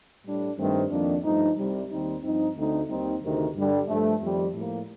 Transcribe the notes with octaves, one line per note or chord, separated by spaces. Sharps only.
A2 G3 D4
G2 D#3 A3 C4
F2 D#3 A#3 D4
G2 F3 A3 D#4
C2 C3 G3
D#2 D#3 G3 C4 D#4
G2 F3 C4 D#4
D2 D3 A3 C4 D#4
D#2 D#3 G3 C4 D#4
D2 C3 D#3
G2 D3 G3 D4
G2 F3 A3
F2 D#3 G3 C4
A2 F3 A#3